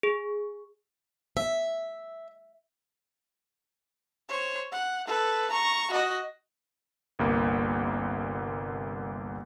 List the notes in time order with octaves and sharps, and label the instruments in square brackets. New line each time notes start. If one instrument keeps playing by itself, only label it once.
[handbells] G#4
[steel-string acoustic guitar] E5
[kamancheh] C5 C#5
F#5
A4 B4
A#5 C#6
F#4 D#5
[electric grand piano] G1 C2 A#3